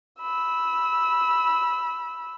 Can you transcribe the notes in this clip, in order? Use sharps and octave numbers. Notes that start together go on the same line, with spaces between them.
B5 E6